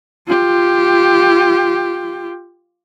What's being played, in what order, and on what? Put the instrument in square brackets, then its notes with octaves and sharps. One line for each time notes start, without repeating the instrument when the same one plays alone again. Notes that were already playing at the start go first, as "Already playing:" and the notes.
[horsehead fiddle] F4 G4